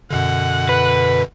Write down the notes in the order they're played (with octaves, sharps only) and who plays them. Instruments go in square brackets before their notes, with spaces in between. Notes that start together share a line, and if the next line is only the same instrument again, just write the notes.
[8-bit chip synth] F#2 B2 D3 [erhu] F#5
[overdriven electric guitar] B4